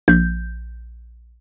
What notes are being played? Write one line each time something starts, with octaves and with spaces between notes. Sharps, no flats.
A#1 G6